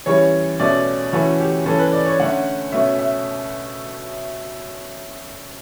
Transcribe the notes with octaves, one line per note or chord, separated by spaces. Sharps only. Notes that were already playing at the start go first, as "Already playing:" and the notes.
E3 G3 C#4 C#5
B2 A3 C#4 D5
E3 A3 C#4 F#4
G4
E3 A3 C#4 A4
B4
D5
C#5
D3 A3 C#4 F#5
B2 A3 C#4 E5
E5